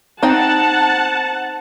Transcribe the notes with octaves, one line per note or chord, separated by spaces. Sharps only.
C4 D#4 F#5 G5 A5